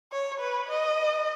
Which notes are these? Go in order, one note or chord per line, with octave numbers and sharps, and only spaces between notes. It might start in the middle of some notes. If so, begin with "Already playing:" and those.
C#5
B4
D#5